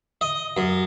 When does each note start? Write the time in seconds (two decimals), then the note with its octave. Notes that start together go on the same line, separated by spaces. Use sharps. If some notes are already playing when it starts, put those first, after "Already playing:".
0.21 D#5
0.57 F#2